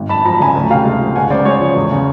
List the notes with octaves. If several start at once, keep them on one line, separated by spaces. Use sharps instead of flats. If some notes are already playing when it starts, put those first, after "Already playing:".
Already playing: G#1
F#2 A5 B5
F3 A#5
B5
C#3 G#5 A#5
D2
C3 F5 G5
G#3
F3
C#2 F#5 G#5
C#3 C5 D5
G#3 C#5
F3
E2
C#3